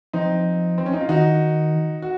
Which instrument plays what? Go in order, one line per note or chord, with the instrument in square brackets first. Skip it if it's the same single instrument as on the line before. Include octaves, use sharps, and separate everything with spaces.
[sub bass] F3 [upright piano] C4 D#4
[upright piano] C4
C#4
D#4
F4
[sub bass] D#3 [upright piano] D#4 F#4
[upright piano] F#4